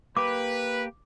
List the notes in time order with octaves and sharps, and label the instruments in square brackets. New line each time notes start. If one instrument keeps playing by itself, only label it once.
[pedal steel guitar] A#3 G4 [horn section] B4 [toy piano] D6